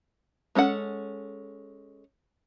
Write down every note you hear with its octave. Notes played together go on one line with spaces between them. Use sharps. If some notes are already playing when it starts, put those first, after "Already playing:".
G#3 C#4 A4 F#5